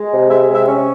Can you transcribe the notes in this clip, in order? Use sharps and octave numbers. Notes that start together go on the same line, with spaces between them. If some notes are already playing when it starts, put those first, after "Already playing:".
Already playing: G#3
C3
G#3 E5
C3
E5
C#4